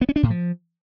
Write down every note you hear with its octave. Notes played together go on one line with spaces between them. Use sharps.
B3
C#4
D4
A2
F3